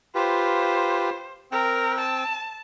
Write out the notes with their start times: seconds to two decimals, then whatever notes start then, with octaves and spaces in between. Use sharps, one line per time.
0.15 F4 G4 B4 C5
1.52 C4 A#4 G5
1.98 A5